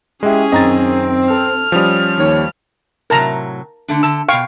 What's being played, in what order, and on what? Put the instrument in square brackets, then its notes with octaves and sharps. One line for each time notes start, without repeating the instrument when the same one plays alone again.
[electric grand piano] G#3 [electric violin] C#4 G#4 [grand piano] E4 G4 E5
[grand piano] F#2 D#3 [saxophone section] C4 [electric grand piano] D#5 A#5 A6
[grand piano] A4 [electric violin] F6
[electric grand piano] F3 G3 [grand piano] C#4 D#6 F7
[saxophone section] D#2 C#5
[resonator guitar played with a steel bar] A2 C3 F#3 [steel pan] A#4 A5 A#5
[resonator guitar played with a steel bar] D3 A3 D4
[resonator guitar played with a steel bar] D3 A5 [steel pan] E6
[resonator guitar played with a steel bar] B2 G5 [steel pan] F5 C#6